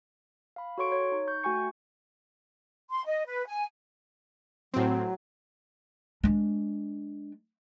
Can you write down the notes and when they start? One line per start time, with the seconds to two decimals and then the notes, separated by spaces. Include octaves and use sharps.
0.56 F5 B5
0.78 F#4 A4 C#5 C6 C#6 D7
0.92 C#5
1.12 D#4
1.27 C#6 G6
1.43 A3 F#4 G5 G#5 C#6 C#7
2.90 C6
3.05 D#5
3.26 B4
3.47 G#5
4.74 A2 F#3 C4
6.23 G#3 D4